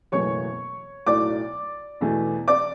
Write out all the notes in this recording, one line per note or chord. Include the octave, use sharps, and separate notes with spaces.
F#1 E2 B2 F#3 A3 C#5 C#6
B1 A2 F#3 A3 D5 D6
E2 B2 A3
D5 D6